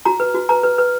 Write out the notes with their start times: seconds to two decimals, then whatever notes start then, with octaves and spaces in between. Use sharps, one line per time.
0.05 F#4 A#5
0.20 B4
0.35 F#4
0.49 B4 A#5
0.63 B4
0.78 B4